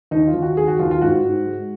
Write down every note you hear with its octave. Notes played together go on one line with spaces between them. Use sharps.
D#2 D#4
F4
D#2
F#4
D#2 G#4
F#4
D#2 F4
F4
G#2 F#4
G#2
G#3